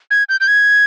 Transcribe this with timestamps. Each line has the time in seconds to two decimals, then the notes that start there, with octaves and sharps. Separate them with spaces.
0.11 G#6
0.29 G6
0.41 G6
0.48 G#6